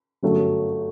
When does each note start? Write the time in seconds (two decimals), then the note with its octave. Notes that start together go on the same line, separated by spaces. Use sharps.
0.23 G1 F#2 F#3 A3